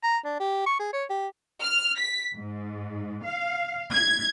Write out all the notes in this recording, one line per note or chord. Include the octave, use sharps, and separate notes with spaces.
A#5
D4
G4
C#6
G#4
C#5
G4
F6
B6
G#2
F5
G#6